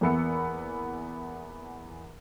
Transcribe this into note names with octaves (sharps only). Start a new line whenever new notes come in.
E2 E3 A#3 B3 E6 C#7